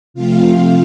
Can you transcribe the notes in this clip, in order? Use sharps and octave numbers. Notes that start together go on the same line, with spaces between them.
C3 F3 A3 C4 F4 F5